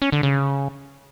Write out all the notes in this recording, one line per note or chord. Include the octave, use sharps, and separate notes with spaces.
C#4
D3
C#3